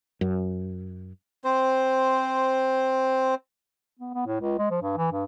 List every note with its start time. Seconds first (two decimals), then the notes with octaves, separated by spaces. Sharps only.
0.21 F#2
1.44 C4 C5
3.99 B3
4.14 B3
4.26 A2
4.40 C#2
4.59 G#3
4.71 F3
4.82 G2
4.97 E3
5.12 G2